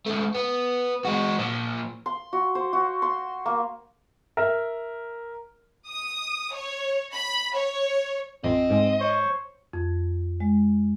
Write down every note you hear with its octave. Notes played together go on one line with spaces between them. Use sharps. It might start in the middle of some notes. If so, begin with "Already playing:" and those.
C#2 A3
B3
G#3 F#4
A#2 F3
C6
F#4
C5
F#4
C6
A#3
A#4 E5
D#6
C#5
B5
C#5
A1 F2 C4 D#5
G#2 G#3
C5 C#5
F2
G#3